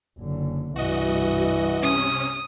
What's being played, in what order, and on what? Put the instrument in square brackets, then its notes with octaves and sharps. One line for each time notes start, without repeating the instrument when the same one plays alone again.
[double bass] F#1 D3
[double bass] C2 G2 [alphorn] E3 [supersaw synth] F#4 D#5
[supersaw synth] C3 C#4 [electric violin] D#6